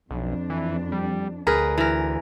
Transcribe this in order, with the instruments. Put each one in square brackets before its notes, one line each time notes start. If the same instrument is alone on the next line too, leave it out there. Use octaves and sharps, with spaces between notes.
[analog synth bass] B1 [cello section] F2 D4
[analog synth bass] E3
G3
[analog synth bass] D2 [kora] G#4 A#4 B4
[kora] E3 A#4